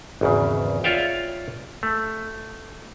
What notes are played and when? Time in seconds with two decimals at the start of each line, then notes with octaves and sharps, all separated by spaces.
0.21 G#1 E2 C#3
0.84 F4 C#5 D5 E5 F5 G5
1.83 A3